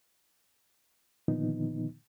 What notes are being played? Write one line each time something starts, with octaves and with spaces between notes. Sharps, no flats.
A#2 D3 D#3 F3 B3 D#4